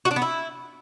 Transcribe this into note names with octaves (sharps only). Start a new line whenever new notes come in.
F#4
D4
B3
E4